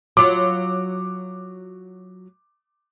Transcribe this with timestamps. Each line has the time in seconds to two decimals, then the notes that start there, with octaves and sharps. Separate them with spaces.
0.17 F#3 F4 D6